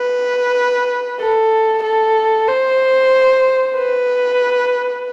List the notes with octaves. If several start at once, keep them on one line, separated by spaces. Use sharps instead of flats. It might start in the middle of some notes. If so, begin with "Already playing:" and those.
Already playing: B4
A4
A4
C5
B4